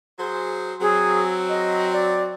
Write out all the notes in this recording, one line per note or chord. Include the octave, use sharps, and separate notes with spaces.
F#3 G#4 C5
F#3 C4 G#4
D#5
D5